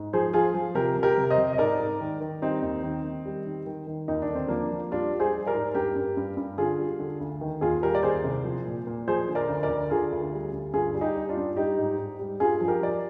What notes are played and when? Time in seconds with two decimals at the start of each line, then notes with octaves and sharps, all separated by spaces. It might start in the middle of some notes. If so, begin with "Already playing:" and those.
Already playing: G#2
0.13 F3 G#4 C5
0.33 F3 F4 G#4
0.54 F3
0.75 C3 G4 A#4
0.96 C3
1.03 G4 A#4
1.18 C3
1.30 C5 D#5
1.38 C3
1.53 D#5
1.58 G#2 A#4 D5
1.79 G#2
2.01 D#3
2.21 D#3
2.42 G3 C4 D#4
2.63 D#2
2.83 D#3
3.05 D#3
3.25 G3
3.45 D#3
3.66 D#3
3.87 D#3
4.08 D#2 D#4
4.22 D4
4.30 D3
4.35 C4
4.48 F3 A#3 D4
4.71 F3
4.91 G3 D4 F4
5.12 G3
5.20 G#4 C5
5.32 G3
5.46 A#4 D5
5.54 G#2
5.75 G2 G4 A#4
5.95 G2
6.17 G2
6.37 G2
6.57 D3 F4 G#4
6.79 G3
6.99 D3
7.20 D2
7.41 D#3
7.61 D#2 F4 G#4
7.82 G3 G4 A#4
7.95 D5
8.03 D#2 G#4 C5
8.24 C2
8.44 F3
8.65 A#2
8.87 A#2
9.07 F3 G#4 C5
9.28 D3
9.35 A#4 D5
9.49 D2
9.63 A#4 D5
9.69 D2
9.90 D3 F4 G#4
10.11 D2
10.33 G3
10.52 D2
10.73 G2 F4 G#4
10.94 G3
11.01 D#4 G4
11.16 G3
11.29 D4 F4
11.37 G2
11.56 G3 D#4 G4
11.78 G#2
11.98 G#2
12.19 G3
12.40 G2 F4 G#4
12.61 F3
12.68 G4 A#4
12.81 F3 D5